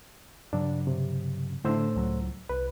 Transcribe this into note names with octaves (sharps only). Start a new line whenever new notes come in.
G2 C#3 F#3 D4
C3
A2 D3 D4 C5 E6
C#2 F#3
C2 B4